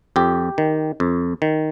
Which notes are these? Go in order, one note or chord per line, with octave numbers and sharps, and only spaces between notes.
F2 G4
D#3
F2
D#3